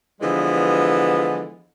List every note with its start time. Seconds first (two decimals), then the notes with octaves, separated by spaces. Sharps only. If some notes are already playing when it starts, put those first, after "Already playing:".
0.21 D3 E3 F3 G3 G#3 B3